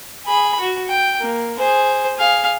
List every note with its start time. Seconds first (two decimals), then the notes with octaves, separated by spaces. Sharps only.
0.26 G#4 B5
0.60 F#4
0.89 G5
1.21 A#3
1.58 G#4 C5
2.16 G#4 F5